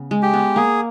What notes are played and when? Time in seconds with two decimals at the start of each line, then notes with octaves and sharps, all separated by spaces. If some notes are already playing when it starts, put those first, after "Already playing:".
Already playing: C#3 B3
0.11 G#3
0.22 G4
0.34 B3
0.56 A#3 G#4